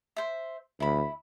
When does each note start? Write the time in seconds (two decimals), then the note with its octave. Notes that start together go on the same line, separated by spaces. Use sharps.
0.16 C5 E5
0.80 D2 E4 B5